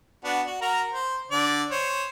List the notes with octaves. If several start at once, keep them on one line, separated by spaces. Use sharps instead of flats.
B3 D4 F#4
F#4
F#4 A#4 A#5
C5
D3 D5
C5 C#5